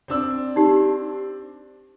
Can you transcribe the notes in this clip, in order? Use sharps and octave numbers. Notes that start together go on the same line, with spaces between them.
C4 D4 E6
D#4 G4